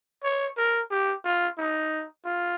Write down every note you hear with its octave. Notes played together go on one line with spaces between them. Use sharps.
C#5
A#4
G4
F4
D#4
F4